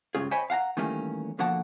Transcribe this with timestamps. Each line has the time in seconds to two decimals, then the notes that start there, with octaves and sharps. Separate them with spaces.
0.15 C#2 G2 C#3 F4 G#4
0.31 C5 C#5 D#5 G5 G#5 B5
0.50 F5 F#5 A5 A#5
0.77 D#3 E3 G3 A3 A#3 C#4
1.39 B2 D3 F3 A#3 F#5 A5